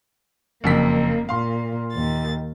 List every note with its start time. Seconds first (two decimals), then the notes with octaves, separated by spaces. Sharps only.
0.64 F#1 F2 A#3 B6
1.29 A#2 F5 C6
1.93 D#2 A6